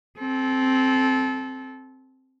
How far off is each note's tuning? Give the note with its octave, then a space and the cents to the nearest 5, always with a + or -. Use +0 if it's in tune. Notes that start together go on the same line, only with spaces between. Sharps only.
C4 +0 A4 -25